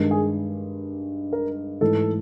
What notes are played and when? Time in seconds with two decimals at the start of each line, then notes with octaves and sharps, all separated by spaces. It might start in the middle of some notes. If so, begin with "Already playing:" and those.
Already playing: G2 D#3 G#3
0.11 G#4
1.33 A#4
1.81 G#2 E3 A3 A4